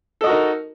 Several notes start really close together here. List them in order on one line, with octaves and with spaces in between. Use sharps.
A4 D#5 F#4 A#4 D#4